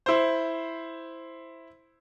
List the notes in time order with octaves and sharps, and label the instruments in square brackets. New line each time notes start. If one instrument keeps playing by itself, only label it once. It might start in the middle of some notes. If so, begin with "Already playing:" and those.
[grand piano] E4 C5